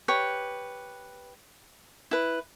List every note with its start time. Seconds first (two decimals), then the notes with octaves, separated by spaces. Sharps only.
0.08 G4 B4 C#5
2.11 E4 B4